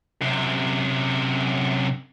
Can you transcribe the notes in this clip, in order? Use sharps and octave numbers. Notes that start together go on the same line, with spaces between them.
F#2 C3